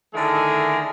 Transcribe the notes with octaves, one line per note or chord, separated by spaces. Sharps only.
D3 D#3 A3 E4 G#4 A#4